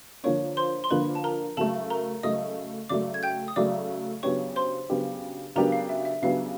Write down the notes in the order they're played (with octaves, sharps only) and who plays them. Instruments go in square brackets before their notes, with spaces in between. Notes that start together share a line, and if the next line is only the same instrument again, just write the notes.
[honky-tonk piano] D3 F3 A#3 D4 [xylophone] C#5 C#6
[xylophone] C5 C6
C6
[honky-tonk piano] D3 F3 A#3 D4 [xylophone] B4 B5
[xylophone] A5
A#4 A#5
[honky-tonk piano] C#3 F#3 A3 [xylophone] A4 A5
[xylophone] A#4 A#5
[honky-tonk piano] C#3 F#3 A3 [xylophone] D#5 D#6
[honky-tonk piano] C#3 F#3 A3 [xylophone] D5 D6
[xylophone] G#6
G5 G6
D#6
[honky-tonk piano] C#3 F#3 A3 [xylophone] D5 D6
[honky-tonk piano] C#3 F#3 B3 D4 G4 [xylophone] C#5 C#6
[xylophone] C5 C6
[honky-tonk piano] C#3 F#3 B3 D4 G4
[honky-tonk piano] C#3 F#3 B3 D4 G4 [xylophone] A#4 A#5
[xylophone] F5
E5
E5
[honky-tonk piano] C#3 F#3 B3 D4 G4 [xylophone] F5